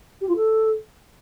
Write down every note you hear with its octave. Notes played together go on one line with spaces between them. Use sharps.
G4
F4
A4